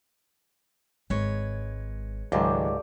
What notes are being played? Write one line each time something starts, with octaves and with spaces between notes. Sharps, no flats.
G#1 G#3 B4 C#5
C#2 G#2 D#3 F#3 G#3 A3 G4 D5